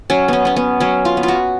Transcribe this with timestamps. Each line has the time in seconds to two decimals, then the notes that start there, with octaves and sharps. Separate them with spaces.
0.10 F#3 C#4
0.28 B3 C#4
0.45 B3 C#4
0.56 B3
0.80 F#3 C#4
1.05 F4
1.17 B3
1.23 F4
1.28 F#4